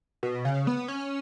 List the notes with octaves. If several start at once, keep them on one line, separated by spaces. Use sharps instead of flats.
B2
C#3
B3
C#4